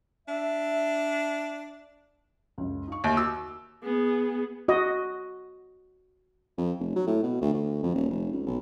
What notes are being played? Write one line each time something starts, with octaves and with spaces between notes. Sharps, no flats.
D4 E5
C#2 F#2
D#4 F5 C#6
D#2 D#5 E5
F#4 D6 E6
B3 G#4
F#4 D#5
F2
F1
F#3
A2
B2
D2
D2
F2
D#1
F1
C#2
B1